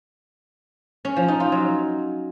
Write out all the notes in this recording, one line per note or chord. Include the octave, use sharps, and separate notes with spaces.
C#4
F3
D#4
F4
F#3